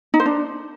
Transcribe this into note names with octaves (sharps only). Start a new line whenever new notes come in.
D#4
C5
D4